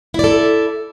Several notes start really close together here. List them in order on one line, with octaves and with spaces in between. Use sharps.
E4 D5 A4